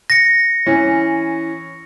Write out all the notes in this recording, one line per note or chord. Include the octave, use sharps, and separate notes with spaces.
A#6 C#7
E3 C#4